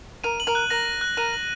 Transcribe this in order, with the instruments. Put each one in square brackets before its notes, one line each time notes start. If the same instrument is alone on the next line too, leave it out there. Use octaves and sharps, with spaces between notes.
[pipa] A#4 [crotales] D#7
[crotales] F#7
[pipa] A#4
[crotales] F#6
[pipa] A#4 [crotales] A#6
[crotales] D#7
F#6
[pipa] A#4 [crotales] D#7
[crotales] F#7